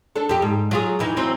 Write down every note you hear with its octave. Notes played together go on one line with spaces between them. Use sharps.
D4 A4
F2 G4
G#2
F#3 F4 G#4
F2 E3 D#4
E3 F#3 C4